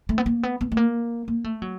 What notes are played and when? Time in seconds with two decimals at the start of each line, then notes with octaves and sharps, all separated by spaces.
0.09 A3
0.18 B3
0.26 A#3
0.43 B3
0.61 B3
0.72 A3
0.77 A#3
1.28 A#3
1.44 A3
1.62 F#3